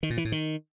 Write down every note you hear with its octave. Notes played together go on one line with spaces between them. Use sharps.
D#3
A#2
E3
A2
D#3